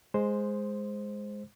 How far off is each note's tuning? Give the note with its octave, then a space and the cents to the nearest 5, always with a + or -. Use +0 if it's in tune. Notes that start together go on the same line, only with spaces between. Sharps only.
G#3 +0 C5 +0